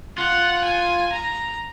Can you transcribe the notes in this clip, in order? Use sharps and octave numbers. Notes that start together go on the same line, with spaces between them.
F4 F#5
G#5
A#5